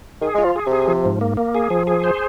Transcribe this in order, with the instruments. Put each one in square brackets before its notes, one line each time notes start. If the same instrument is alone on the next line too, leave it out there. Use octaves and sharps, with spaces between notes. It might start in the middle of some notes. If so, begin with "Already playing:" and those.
[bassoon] D#3 [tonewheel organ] G#4
[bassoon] G#3 [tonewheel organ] F4
[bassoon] F3
[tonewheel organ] G#4
[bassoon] C3 [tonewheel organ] G#4
[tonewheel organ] F3
G#2
A#3
A#3
G#4
F3
G#4
C5